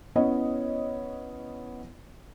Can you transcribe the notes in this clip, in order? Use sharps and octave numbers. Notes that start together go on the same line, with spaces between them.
B3 C#4 E4 C#5 D#5